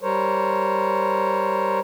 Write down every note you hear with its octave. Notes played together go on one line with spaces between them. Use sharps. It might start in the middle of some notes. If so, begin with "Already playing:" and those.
G3 A#4 C5 C#5